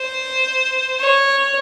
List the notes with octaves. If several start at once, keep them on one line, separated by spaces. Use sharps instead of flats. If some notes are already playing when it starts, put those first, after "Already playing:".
Already playing: C5
C#5